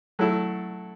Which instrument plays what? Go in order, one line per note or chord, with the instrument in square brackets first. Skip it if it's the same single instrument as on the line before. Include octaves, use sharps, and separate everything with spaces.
[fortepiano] F#3 A3 E4 A4